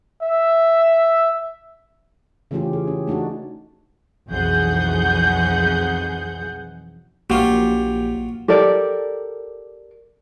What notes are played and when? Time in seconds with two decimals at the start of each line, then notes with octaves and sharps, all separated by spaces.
0.23 E5
2.51 C#3 E3 A3 C#4 F4 G4
2.73 G#4
2.87 C#4
3.07 A3 D4 D#4 F#4
4.29 B1 F2 E3 G#4 F#5 G6
7.30 A#1 F#3 A#3 F4 G4
8.48 G4 A4 A#4 D5